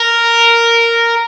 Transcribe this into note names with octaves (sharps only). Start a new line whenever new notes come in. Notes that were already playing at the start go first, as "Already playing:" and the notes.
Already playing: A#4